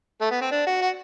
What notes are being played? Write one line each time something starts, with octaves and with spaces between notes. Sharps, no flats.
A3
B3
C4
D4
F#4
F#4